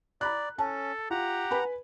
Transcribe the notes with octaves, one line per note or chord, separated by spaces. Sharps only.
D5 A#5 B5 F#6
C#4 A4 A5
F4 G4 F#5 A#5
B4 G#5 B5